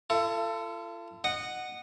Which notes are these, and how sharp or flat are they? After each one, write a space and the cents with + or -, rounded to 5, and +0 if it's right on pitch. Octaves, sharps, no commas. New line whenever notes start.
F4 -40 A4 +20
D#5 -20 F#5 +0